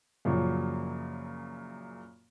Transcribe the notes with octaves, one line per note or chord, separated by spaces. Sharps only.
F#2 A#2 C#3 F3 F#3